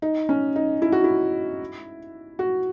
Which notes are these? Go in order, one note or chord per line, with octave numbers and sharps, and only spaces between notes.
D#4
C#4
D#4
E4
F#4
E4
F#4